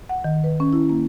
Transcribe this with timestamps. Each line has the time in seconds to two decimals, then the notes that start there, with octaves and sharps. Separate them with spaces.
0.09 F#5
0.24 D#3
0.44 B4
0.60 C#4
0.73 E4
0.90 A#3